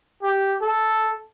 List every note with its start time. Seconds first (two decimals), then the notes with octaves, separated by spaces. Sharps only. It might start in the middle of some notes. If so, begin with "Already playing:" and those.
0.23 G4
0.62 A4